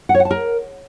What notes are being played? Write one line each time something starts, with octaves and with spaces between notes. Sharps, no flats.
F#5
C#5
F#5
A5
A#4